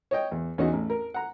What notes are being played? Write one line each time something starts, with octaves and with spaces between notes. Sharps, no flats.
C#5 D#5 G5
E2
E2 C#4 D#4 F#4 D#5
A1
A#4
F#5 A#5